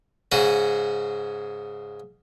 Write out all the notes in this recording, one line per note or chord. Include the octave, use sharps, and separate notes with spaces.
G#2 C#3 F#4